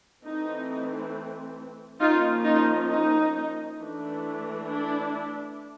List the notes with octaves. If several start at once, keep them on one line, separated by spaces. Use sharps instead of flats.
E3 A3 C4 D#4
F3 A#3 C#4 D#4 F4
D#4 F4
D#4
E3 A3 D4
D4 E4